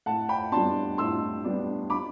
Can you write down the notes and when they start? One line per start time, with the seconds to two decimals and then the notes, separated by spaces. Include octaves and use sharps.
0.06 A2 F#5 A5
0.29 G5 B5
0.52 G3 B3 D4 A5 C6
0.98 A2 C6 E6
1.44 G3 B3 D4
1.90 B5 D6